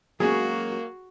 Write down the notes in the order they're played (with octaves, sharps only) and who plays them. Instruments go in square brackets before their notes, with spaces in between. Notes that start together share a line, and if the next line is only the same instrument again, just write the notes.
[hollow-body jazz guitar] F#3 G#3 C#4 [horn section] A#3 [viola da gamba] F#4 [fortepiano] G#4